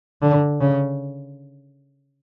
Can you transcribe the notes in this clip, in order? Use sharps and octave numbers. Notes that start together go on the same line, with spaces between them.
D3
C#3